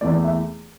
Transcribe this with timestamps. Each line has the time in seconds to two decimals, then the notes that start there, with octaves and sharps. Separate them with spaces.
0.01 E2 E3 A3 D5
0.24 E5